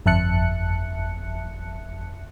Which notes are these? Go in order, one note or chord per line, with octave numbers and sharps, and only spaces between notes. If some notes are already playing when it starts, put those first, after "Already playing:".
G1 F2 E5 A5 F#6 C#7